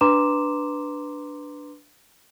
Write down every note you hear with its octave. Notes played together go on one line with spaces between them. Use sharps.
D4 B4 A#5 C6 D6 E7